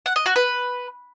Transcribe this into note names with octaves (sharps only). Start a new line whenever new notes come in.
F#5
D#5
F#4
B4